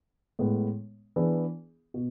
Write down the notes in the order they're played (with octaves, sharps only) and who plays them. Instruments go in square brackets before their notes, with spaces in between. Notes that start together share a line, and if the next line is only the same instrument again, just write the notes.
[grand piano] A2 G#3 B3
E3 B3 D4 G#4
B2